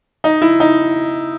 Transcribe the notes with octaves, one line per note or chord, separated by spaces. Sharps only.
D#4
E4
D#4